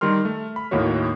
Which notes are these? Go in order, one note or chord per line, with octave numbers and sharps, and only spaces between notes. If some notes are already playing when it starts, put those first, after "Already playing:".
D#3 G3 A#4 C6 F6
A3
B5
D#2 A2 D#3 A#3 F#4 C#5